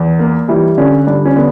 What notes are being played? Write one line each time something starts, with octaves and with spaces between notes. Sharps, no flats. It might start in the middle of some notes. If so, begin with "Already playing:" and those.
Already playing: E2
A#3
E3 G3 E4
D3 C#4
G2 D3 D4
C#4
D3 B3